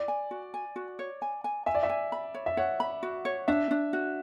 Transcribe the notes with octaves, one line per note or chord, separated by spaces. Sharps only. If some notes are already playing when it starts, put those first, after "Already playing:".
Already playing: D5
G#5
F#4
G#5
F#4
C#5
G#5
G#5
E5 G#5
D5
E5
G#5
B5
C#5
E5
C#5 F#5
B5
F#4
C#5
D4 E5
D4
F#4